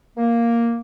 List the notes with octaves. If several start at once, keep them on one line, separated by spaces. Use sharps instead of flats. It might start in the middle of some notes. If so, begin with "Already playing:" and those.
A#3